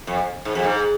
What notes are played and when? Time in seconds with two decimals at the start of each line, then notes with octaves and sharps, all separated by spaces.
0.07 F2
0.45 G#2
0.55 F2
0.65 G#2